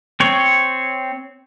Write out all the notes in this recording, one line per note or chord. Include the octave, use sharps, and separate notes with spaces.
C4 C#5